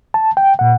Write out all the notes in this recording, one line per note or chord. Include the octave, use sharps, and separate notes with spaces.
A5
G5
A#2 F#5